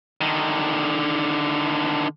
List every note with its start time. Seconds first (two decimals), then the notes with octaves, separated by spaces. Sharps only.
0.21 D3 D#3